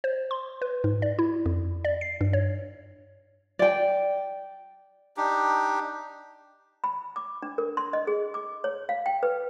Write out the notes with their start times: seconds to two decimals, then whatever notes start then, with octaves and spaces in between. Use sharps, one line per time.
0.04 C5
0.31 C6
0.62 B4
0.84 G#2
1.02 D5
1.19 E4
1.46 F2
1.85 D5
2.01 C7
2.21 G2
2.33 C#5
3.59 D5 G5
5.17 D4 D#4 G4
6.84 B5
7.16 D6
7.43 D4
7.58 A#4
7.77 C6
7.93 D#5
8.07 G#4
8.34 D6
8.64 C#5
8.89 F5
9.06 G5
9.23 B4